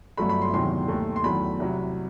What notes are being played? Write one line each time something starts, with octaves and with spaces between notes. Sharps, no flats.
G1 G2 F#3 A3 B5
B5
C6
E1 E2 C3 D#3 F#3 C6
D#2 D#3 A3
C6
E2 D#3 F#3 A3 B5
C2 C3 F#3